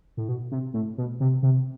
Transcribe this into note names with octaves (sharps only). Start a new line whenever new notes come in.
A2
B2
C3
A2
B2
C3
C3